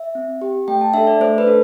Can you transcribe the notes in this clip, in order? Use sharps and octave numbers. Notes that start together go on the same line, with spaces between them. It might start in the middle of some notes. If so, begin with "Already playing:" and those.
Already playing: E5
C4
G4
A3 G5
A5
D4 A4 E5
D5
A3 C5
B4
D4 A4